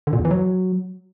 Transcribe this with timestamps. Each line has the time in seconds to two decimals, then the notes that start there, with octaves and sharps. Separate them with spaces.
0.07 D3
0.13 A#2
0.19 E2
0.25 E3
0.31 F#3